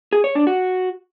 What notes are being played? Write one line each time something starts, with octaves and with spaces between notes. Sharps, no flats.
G#4
C#5
D4
F#4